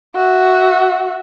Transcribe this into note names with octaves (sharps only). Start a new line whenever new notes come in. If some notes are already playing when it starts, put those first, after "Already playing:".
F#4 E5